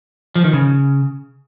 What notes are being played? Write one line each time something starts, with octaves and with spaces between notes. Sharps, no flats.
F3
D#3
C#3